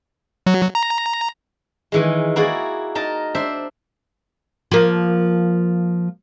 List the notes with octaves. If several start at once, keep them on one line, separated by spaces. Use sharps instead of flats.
F#3
A#5
D#3 E3 G#3
A#3 E4 F#4 G#4 D5
D#4 A#4 A5
D4 C5 E5
F3 A#3